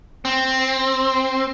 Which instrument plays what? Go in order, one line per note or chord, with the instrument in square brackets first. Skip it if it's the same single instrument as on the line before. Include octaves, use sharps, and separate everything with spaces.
[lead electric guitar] C4